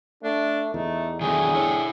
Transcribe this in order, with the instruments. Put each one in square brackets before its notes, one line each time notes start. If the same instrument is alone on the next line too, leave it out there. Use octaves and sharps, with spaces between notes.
[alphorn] A3 [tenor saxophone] D4
[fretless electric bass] E2 [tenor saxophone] A3 [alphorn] D#4
[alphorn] D3 [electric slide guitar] D#3 F#3 A3 [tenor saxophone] G#4
[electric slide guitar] E4 C#5